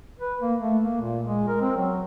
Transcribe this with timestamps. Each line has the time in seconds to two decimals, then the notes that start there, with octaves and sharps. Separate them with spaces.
0.20 B4
0.41 A#3
0.59 A3
0.84 A#3
1.01 A#2
1.24 G#3
1.48 A#4
1.61 C4
1.77 F#3